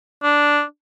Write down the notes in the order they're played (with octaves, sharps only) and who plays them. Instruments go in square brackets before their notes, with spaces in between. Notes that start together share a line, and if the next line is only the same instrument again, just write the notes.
[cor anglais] D4